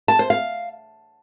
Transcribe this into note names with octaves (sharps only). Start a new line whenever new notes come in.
A5
C5
F5